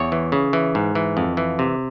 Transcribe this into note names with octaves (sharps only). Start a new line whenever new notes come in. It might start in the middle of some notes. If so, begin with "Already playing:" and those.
Already playing: E2 C#5
E3
C#3
E3
G#2
E3
F2
E3
C3